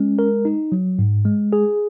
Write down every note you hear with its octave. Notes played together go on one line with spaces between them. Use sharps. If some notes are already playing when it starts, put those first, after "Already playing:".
Already playing: G#3 C#4
A#4
D#4
F#3
G#2
G#3
G#4